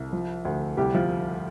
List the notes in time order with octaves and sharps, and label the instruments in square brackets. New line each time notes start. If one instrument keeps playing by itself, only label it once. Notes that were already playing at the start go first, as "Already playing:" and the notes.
Already playing: [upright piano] C2
F3
D2
C2 G3 G4
F3 F4